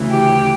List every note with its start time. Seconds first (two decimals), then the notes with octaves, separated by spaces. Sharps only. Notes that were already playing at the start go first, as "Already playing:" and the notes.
Already playing: D2 C#3 E3
0.10 G4